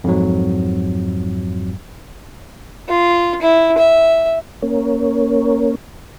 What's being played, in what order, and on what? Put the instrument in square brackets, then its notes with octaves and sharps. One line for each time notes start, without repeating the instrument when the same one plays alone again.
[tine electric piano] F2 G#2 F#3
[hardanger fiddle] F4
E4
E5
[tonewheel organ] A#3 C#4